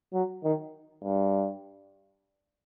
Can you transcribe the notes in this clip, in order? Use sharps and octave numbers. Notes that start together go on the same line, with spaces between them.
F#3
D#3
G2